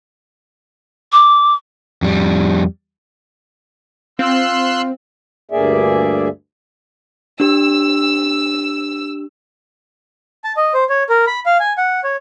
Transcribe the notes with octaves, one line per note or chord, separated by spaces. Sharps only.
D6
F2 G3
C4 F4 C6 E6 F#6
D2 G2 A#3 G#4 D5 E5
D4 G4 E6
A5
D#5
C5
C#5
A#4
B5
F5
G#5
F#5
C#5